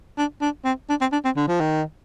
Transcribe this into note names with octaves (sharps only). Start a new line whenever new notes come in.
D4
D4
C4
D4
C4
D4
C4
D3
F3
D#3